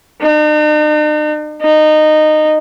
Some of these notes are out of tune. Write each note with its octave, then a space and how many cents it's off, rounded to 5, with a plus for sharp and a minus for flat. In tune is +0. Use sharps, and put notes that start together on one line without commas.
D#4 -45
D#4 -15